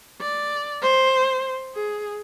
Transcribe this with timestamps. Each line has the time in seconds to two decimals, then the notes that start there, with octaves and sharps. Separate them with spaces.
0.21 D5
0.82 C5
1.75 G#4